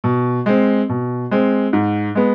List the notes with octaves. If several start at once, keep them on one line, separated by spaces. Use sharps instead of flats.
B2
G#3 C4
B2
G#3 C4
G#2
G#3 B3